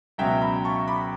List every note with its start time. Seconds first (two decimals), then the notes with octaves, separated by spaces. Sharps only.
0.18 C#2 B2 F#3 C#4 E5 G5
0.41 G5 B5
0.64 A5 C#6
0.87 B5 D6